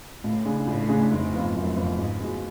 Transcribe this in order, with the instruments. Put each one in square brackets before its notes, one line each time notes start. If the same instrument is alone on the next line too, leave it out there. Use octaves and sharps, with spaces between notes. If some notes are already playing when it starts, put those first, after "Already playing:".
[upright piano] C#2 [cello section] A2
[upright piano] C#3 G#3 D4 G#4
[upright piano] C#2 [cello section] A2
[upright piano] C#3 G#3 D4 G#4
[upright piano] F1 [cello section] G#2
[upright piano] F2 F3 B3 F4
[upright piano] F1 [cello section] F#2
[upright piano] F2 F3 B3 F4
[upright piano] C#2 [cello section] G#2
[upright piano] B2 G#3